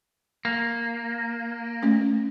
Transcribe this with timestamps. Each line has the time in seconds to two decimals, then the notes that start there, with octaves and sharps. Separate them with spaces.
0.45 A#3
1.83 A3 C#4